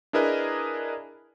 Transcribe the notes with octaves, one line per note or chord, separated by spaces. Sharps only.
D4 E4 G#4 A#4 B4 D#5